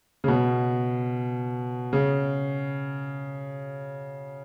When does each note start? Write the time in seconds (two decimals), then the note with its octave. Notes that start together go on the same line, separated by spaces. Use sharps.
0.24 C#3
0.28 B2
1.93 C#3